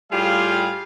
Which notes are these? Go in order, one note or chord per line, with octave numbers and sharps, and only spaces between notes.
A2 G3 F4 G4 G#4 F5